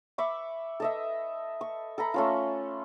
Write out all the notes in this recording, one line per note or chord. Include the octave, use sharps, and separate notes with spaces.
E5 B5 C#6 D6
A4 D#5 E5
C#6
A4 A#5 B5
A3 C#4 F4